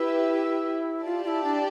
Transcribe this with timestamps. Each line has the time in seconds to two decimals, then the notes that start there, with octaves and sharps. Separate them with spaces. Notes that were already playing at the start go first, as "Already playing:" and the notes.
Already playing: E4 G4 B4 E5
1.05 F4 G4 D5 A5
1.24 F4
1.28 E4
1.44 D4